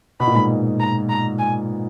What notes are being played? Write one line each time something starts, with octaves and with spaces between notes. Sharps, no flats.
B2 B5
A#2
G#2 B2
A#5
A#5
G#5